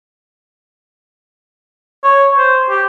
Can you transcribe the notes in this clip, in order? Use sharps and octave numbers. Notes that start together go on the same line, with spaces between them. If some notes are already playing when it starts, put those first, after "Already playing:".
C#5
C5
G4